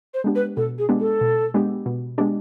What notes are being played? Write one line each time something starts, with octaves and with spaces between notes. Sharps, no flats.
C5
G#3 B3 D4 G4
B4
B2 A4
G#4
G#3 B3 D4 G4
A4
B2
G#3 B3 D4 G4
B2
G#3 B3 D4 G4